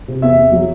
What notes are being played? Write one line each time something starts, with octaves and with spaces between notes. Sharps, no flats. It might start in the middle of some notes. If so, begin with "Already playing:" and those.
C3
E2 E5
E2
F#3